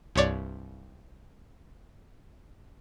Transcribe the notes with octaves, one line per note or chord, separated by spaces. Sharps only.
C2 G2 C#5 D5